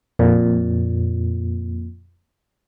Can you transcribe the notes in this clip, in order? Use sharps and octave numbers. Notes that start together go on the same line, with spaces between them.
F2 A#2